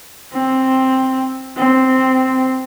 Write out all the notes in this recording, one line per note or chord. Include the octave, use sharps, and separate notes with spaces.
C4
C4